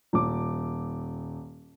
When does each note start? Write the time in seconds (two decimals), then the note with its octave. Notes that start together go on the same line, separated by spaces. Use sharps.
0.13 D#1 D6